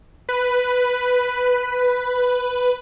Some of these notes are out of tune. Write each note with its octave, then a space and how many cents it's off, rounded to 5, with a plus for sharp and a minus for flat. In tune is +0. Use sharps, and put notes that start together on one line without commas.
B4 +5